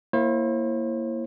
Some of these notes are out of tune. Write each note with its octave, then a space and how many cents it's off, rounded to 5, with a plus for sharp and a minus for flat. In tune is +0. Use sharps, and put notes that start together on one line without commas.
A#3 +0 E4 +10 C5 +45